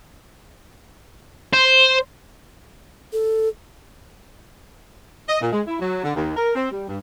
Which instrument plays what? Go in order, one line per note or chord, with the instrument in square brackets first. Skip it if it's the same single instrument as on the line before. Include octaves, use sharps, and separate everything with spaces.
[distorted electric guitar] C5
[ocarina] A4
[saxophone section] D#5
A#2
G#3
E4
F#3
D3
D#2
A#4
C4
G3
G2